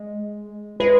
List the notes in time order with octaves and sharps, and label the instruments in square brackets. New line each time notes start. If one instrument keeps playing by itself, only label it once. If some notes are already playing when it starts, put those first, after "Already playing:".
Already playing: [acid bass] G#3
[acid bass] G#3 [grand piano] B4